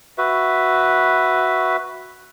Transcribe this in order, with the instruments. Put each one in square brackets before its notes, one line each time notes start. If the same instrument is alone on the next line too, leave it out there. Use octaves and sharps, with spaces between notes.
[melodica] F#4 B4 E5